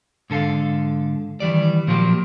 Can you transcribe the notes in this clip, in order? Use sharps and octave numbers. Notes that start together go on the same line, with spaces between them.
G#2 D3 A4 F5
D#3 E3 G3 D5
A#2 F3 F#3 A#3 G4